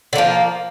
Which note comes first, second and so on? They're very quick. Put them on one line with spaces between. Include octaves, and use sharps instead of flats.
D3 A#3 F3